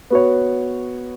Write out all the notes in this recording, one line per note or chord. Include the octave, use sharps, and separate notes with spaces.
B3 F#4 C#5